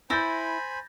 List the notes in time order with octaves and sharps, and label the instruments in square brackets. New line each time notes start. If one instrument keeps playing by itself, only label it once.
[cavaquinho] E4 [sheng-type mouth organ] C5 G#5 B5 [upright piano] G6 A6 A#6